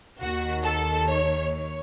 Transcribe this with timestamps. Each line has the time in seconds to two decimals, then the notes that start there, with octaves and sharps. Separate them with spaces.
0.21 D#2 D#3 F#4
0.65 A4
1.08 C#5
1.52 C#5